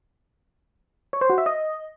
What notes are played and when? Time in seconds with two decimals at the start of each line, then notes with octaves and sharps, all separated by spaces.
1.13 C#5
1.21 C5
1.30 F#4
1.38 E5
1.46 D#5